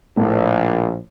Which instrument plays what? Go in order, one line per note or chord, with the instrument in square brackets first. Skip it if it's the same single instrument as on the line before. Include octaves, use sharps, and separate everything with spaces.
[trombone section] A#1 [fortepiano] A2